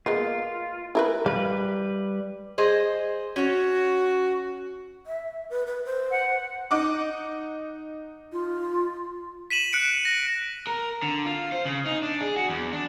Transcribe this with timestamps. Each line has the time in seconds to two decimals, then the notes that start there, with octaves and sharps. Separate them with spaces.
0.06 G#3 A#3 B3 F4
0.95 E4 A#4 B4
1.26 G3 B4 F5
2.58 G#4 C5 D#5
3.36 C#4 F#4 C#5
5.07 E5
5.50 B4
5.66 B4
5.85 C5
6.11 F#5
6.71 D#4 F#5 D6
8.33 F4
9.50 B6 D#7 E7 F#7
9.73 F#6 C#7 D7
10.05 A#6
10.67 A#4
11.02 D3
11.26 F4
11.52 C5
11.65 C#3
11.86 D#4
12.02 D4
12.21 G#4
12.36 F#4
12.49 E2
12.73 D4